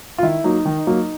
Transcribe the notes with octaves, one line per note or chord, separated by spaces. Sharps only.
F4
D#3 E4
F#3 A#3 D#4
D#3 D#4
F#3 A#3